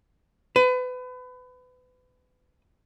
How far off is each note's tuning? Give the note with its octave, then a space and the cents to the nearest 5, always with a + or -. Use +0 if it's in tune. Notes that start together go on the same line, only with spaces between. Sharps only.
B4 +30